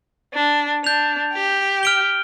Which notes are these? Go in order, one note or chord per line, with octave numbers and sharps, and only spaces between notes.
D4
D4 G6 F7
G4
F6 D7 G7